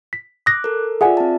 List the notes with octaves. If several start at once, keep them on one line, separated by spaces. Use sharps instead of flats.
B6
D6 D#6 F#6 A#6
A4 A#4
F4 G#4 D5 E5 F#5 G#5
C4 A5